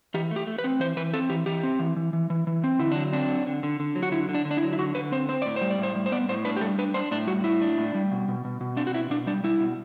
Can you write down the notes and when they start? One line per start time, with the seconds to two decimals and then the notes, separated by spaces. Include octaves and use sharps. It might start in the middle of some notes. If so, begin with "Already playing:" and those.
0.14 E3 G4
0.31 A3
0.36 G4
0.47 A3
0.58 B4
0.64 C4
0.80 E3 C5
0.97 E3 B4
1.14 C4 A4
1.30 E3 G4
1.46 E3 G4
1.63 C4
1.79 E3
1.96 E3
2.13 E3
2.30 E3
2.47 E3
2.64 C4
2.79 D3 E4
2.91 F#3 D4
3.13 C4 D4
3.29 D3
3.46 D3
3.63 D3
3.80 D3
3.95 F#3
4.03 F#4
4.12 D3 E4
4.29 D3
4.35 D4
4.45 D3
4.51 D4
4.57 E4
4.63 F#3
4.73 E4
4.79 D3 F#4
4.95 D3 B4
5.12 C4 C5
5.29 C4 C5
5.42 A2 D5
5.56 G3 C5
5.70 D5
5.78 A2 C5
5.95 G3
6.06 C5
6.12 B3 D5
6.29 A2 C5
6.45 D4 B4
6.56 G4
6.61 G3 A4
6.79 D4 B4
6.94 D4 C5
7.11 A2 D4
7.27 G3 F#4
7.44 A2 E4
7.62 D4
7.78 A2
7.95 G3
8.11 B2
8.28 B2
8.45 B2
8.61 B2
8.77 C4 D4
8.87 F#4
8.93 B2 E4
9.10 B2 D4
9.27 G3 D4
9.44 G3 E4
9.60 B2